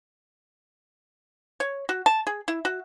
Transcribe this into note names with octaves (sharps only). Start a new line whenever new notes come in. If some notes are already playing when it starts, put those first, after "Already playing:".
C#5
F#4
A5
G#4
E4
F#4